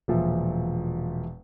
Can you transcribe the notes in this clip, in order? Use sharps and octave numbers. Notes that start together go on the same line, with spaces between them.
E1 A#2 F3 E5